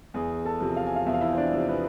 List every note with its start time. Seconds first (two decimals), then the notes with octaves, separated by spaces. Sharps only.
0.14 E2 G#4 G#5
0.45 A4 A5
0.60 C3 F3
0.77 F5
0.86 G#5
0.96 F4 F5
1.06 E2 E5
1.14 F5
1.21 E4 E5
1.33 C5
1.37 D4 D5
1.53 C3 F3
1.68 B3 B4